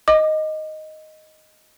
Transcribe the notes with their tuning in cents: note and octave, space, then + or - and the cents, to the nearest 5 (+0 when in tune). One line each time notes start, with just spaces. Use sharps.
D#5 +0 D6 +30